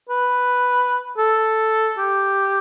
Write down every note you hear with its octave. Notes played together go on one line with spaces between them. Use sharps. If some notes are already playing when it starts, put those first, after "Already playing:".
B4
A4
G4